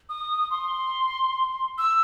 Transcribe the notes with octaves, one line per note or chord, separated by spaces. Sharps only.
D#6
C6
E6